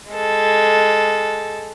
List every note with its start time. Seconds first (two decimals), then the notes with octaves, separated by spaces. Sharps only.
0.11 G#3 A4